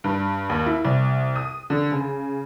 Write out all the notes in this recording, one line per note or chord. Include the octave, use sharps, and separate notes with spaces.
G2
D#2
E4
C2
D#6
D3
C#3